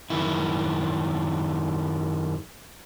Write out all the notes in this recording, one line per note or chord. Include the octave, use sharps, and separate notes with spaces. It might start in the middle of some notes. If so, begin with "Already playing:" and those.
F#2 D#3 E4